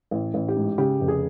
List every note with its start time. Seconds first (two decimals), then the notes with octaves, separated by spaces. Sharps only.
0.11 A1
0.34 A1
0.48 G4
0.56 G#2
0.78 C#3 G4
1.00 F1
1.08 G#4